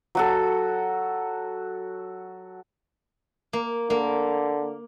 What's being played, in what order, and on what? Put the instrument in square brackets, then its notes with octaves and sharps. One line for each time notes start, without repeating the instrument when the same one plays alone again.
[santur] F#3 F#4 A4
[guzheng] A#3
[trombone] D3 [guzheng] A#3